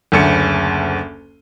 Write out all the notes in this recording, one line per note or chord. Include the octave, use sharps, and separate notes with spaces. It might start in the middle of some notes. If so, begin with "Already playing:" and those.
F#1 D2 C#7